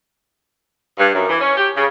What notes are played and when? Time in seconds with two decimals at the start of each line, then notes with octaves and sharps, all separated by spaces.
0.99 G2
1.14 F#2
1.29 E3
1.41 C#4
1.57 G4
1.76 C#3